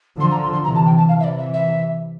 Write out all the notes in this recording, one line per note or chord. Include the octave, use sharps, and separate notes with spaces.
D3 F3 C6
A#5
C6
C6
C3 E3 A#5
A5
G5
A5
C3 E3 F5
E5
D5
E5
E5